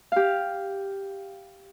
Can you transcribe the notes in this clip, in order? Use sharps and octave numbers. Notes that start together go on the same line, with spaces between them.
G4 F5